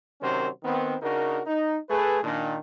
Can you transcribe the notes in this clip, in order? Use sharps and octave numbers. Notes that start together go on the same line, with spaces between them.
C3 D#3 F#3 C#4 A#4 C5
D#3 B3 C4
C#3 D4 D#4 F#4 A#4
D#4
A3 G#4 B4
A#2 D#3 D4